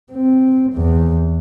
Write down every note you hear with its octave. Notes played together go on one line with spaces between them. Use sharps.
C4
E2